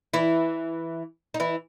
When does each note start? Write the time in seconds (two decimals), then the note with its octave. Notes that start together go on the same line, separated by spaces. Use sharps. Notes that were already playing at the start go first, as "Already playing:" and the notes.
0.14 E3 E4
1.34 D#4
1.40 E3 E4